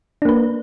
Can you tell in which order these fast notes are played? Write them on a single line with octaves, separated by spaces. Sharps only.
D4 A#3 B4